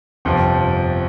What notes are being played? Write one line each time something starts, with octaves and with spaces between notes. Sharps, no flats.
G1 F2 C3 F3 G4